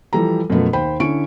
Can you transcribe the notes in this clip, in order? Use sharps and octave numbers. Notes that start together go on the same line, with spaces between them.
E3 F3 G3 A4 A#5
F#2 B2 F3 A3 B3
D#2 C5 G5 B5
D3 C#4 E4 C#6 D7